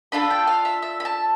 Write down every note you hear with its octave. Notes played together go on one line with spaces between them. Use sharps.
D4 F4 A4 B5
G5
F5
E5
E5
B5
A5